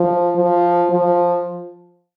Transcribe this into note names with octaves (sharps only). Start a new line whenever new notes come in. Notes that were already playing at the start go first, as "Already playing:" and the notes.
Already playing: F3
F3
F3